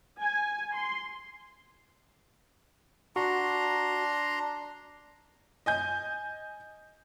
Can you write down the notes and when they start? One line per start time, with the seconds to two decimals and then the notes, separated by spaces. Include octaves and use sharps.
0.20 G#5
0.74 C6
3.16 D4 F#4 A#5 C6
5.66 D#5 G#5 G6